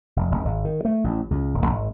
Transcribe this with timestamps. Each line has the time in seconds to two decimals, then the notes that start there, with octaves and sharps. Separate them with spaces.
0.16 F1
0.31 F1
0.45 G#1
0.65 D#3
0.85 A3
1.04 A1
1.30 C#2
1.54 D#1
1.66 G#1